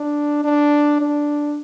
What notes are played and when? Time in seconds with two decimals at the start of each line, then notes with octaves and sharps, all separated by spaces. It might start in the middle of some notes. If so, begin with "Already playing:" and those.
Already playing: D4
0.44 D4
1.01 D4